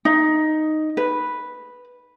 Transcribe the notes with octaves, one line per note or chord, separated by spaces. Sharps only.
D#4
B4